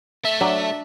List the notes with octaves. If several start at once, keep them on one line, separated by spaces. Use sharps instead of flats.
A3 E5
F#3 D4